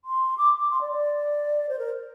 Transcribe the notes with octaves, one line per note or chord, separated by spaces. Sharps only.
C6
D6
D6
C6
D5
D5
C5
A#4